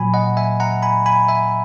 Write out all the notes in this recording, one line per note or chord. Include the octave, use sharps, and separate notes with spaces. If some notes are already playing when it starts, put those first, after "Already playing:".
Already playing: A#2 F#3 G#5 B5
D#5 F#5
E5 G#5
F#5 A#5
G#5 B5
G#5 B5
E5 G#5